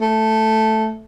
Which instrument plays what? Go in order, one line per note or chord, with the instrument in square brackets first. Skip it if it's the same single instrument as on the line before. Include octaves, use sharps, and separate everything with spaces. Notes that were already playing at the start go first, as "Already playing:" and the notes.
[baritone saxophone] A3